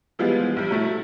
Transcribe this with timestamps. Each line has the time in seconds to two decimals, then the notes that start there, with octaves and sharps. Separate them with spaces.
0.19 E3 F3 G3 G#3 B3
0.56 A#1 G3
0.71 F#3 A3 E4